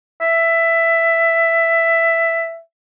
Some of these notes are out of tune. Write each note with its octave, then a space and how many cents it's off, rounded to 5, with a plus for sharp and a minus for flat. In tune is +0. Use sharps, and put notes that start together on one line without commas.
E5 +10